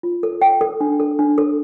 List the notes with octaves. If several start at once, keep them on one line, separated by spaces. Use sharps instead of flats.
F4
A4
G5
A4
D4
A4
D4
A4